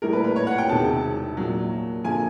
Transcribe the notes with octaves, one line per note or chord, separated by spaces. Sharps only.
A#1 A2 E3 G3 A#4
B4
B4
C#5
F#5
G5
E1 E2 C3 D#3 G#3 A5
A#1 A#2 F#3
F#2 D3 F3 A#3 G#5